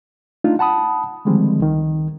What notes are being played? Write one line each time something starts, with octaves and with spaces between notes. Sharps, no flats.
A3 D4 D#4 F4
F#5 A5 B5 D#6
D3 D#3 F3 G3 G#3 C4
C#2 D#3